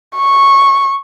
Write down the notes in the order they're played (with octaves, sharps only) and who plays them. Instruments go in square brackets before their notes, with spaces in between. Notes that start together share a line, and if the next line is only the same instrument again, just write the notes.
[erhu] C#6